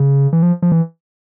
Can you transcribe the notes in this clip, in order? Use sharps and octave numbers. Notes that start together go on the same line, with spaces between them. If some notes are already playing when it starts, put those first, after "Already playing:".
Already playing: C#3
E3
F3
F3
E3